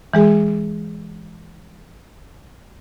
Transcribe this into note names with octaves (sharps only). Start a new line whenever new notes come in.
E3 G#3 G#4